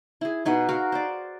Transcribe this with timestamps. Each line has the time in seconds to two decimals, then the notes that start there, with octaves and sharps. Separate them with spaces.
0.21 E4 G#4
0.45 B2 B3 D#4 G#4
0.69 F#4 A#4 F5
0.92 C5 D5